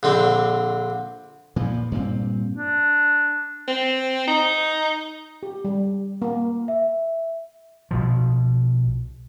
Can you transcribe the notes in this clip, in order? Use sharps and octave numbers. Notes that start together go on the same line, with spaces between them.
A#1 D3 C4
A#2 E3 F3
G2 A#2 C4
D4
C4
D#4
G4
G3
A#3
E5
B1 B2 F3